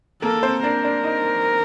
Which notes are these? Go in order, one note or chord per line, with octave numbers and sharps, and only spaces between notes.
A#3 A4 A#4
C4 C5
D4 A#4 D5
D4 D5
D#4 D#5